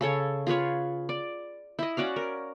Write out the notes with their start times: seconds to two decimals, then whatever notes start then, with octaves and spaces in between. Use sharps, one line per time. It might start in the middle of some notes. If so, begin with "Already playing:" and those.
0.01 C#3 A4 C#5
0.47 F4 G#4 B4 C#5
1.09 D5
1.79 E4 D#5
1.97 C#4 F#4 D5 F5
2.16 A#4